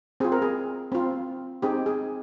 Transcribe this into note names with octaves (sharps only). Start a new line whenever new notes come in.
C4 F4 G#4
A#4
G#4
C4 F4
C4 D#4 G4 G#4
G#4